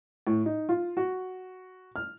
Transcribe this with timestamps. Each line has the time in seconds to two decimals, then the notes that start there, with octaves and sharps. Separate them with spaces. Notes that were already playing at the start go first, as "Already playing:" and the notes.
0.27 A2
0.46 D#4
0.69 F4
0.97 F#4
1.96 F6